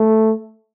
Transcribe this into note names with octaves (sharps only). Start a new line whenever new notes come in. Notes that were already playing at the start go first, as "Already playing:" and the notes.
Already playing: A3